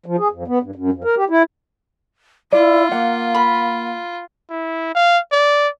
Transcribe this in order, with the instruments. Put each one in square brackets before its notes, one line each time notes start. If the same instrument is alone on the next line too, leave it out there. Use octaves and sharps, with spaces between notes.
[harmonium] F3
G#4
F2
B3
G2
F#2
F2
A#4
G4
E4
[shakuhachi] E4 [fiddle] F4 [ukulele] D5
[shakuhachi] A#3 [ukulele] F#5
[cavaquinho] B5
[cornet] E4
F5
D5